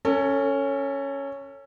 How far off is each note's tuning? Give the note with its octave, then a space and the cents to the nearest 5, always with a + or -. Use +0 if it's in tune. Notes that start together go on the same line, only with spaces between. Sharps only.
C#4 +0 A4 +30